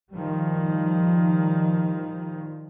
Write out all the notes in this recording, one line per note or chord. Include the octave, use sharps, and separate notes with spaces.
D#3 F3 G3